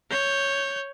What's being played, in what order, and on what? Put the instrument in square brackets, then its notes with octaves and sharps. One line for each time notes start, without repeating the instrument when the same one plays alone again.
[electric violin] C#5 G6